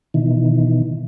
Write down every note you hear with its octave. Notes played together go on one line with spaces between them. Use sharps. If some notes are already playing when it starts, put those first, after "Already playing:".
B2 D#3 E3